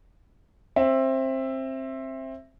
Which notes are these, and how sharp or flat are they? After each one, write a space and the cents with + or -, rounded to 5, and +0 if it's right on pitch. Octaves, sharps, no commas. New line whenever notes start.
C4 +20 E5 +5